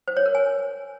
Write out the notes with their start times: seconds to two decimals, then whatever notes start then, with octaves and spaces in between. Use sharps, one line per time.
0.08 C5
0.17 C#5
0.26 A#4
0.35 G#5